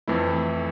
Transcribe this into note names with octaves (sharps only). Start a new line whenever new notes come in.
F2 E3 A3 E4